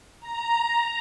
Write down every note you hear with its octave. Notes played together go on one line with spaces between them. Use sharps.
A#5